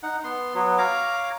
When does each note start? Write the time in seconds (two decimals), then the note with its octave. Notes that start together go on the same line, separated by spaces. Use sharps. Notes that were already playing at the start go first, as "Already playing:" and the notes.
0.03 D#4 F#5
0.24 B3 C6
0.55 F#3 B3
0.78 C#5 F5 A#5 D6